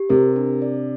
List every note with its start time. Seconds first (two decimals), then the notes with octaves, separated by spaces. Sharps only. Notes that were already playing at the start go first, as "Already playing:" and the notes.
Already playing: G4
0.09 C3 A#4
0.36 D4
0.62 D5